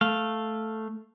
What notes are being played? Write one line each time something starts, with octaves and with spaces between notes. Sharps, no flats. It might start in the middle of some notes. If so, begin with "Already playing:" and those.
A3 F5